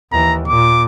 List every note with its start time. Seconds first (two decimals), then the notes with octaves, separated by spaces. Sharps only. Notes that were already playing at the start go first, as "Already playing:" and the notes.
0.12 D#2 E3 A#5
0.48 A#2 D6